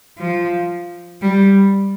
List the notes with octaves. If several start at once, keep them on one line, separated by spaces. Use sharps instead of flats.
F3
G3